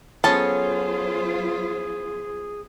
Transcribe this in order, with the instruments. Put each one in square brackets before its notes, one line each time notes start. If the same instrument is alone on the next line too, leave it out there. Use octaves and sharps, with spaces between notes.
[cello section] F#3 F4 C5 [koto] B3 C#4 [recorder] G#4 [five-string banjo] A4 A5